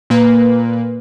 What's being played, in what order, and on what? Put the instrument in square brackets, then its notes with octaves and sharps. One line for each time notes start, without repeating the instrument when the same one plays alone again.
[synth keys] A#2 A#3 B4